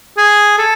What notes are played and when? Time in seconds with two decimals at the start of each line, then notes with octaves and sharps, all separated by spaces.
0.18 G#4
0.58 A4